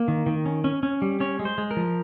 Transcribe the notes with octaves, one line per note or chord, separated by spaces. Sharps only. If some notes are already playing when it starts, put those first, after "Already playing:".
Already playing: A#3
D#3
D#3
C#4
C#4
C#4
G3
C#4 C#5
G#3
C5
G#3
A#4
F3